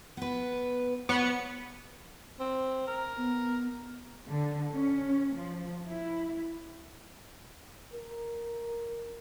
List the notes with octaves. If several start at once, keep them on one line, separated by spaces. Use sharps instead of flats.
B3 B4
B3 C#5 C#7
C4
A#4
B3
D3
C#4
F3
E4
A#4